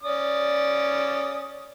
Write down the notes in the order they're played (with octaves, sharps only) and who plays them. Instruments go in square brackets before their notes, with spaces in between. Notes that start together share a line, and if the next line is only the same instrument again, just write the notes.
[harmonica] C#4 D5 D#6